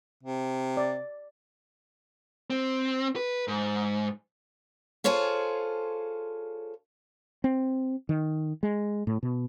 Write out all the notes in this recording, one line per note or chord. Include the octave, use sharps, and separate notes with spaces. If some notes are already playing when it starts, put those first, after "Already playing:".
C3
D5
C4
B4
G#2
F4 G#4 A4 C5 C#5 F5
C4
D#3
G#3
A2
B2